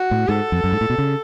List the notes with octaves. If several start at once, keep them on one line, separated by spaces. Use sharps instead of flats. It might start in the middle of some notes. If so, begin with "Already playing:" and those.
Already playing: F#4
A2
G#2 A4
F2
F#2
G#2
A2
B2
C#3